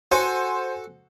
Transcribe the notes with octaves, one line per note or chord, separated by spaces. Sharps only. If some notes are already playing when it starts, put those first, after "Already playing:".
F#4 A4 C5 G#5